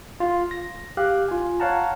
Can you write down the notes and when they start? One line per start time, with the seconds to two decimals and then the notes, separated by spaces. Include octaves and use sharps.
0.20 F4
0.51 A#6
0.97 G4 F5 F#6
1.28 F4 G#5
1.60 C#5 F5 F#5 A5 A#5